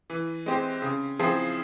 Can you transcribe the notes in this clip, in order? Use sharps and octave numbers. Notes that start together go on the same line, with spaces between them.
E3
G#3 C4 G4
C#3
F3 C4 E4 G#4